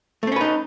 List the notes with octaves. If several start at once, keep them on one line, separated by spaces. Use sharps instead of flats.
A3 C4 C#4 D#4 B4